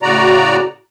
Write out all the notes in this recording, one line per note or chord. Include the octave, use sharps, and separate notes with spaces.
A2 C#3 F#4 D5 A#5